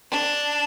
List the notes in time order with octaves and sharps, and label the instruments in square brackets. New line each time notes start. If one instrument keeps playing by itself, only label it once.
[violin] D4